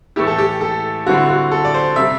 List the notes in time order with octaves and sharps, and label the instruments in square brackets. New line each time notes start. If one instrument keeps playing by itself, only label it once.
[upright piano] A2 E3 A3 E4 G4
A4
G4
A4
D3 G3 C4 E4 F#4
F#4
A4
D5
C5
C3 G3 C4 E5